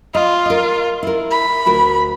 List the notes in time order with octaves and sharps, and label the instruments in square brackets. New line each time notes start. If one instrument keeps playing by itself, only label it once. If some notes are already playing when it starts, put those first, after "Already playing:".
[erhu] F4 [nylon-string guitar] D#5
[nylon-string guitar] A#4 D#5
E4 A#4
[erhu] B5
[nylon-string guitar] D2 F#4 A#4